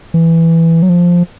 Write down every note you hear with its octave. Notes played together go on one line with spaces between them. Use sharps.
E3
F#3
F3